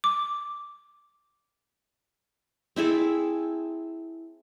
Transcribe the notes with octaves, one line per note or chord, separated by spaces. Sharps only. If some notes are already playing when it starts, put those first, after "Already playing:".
D6
C4 E4 G#4 A4